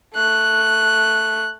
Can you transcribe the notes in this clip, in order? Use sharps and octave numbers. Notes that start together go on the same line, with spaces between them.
A3 F#6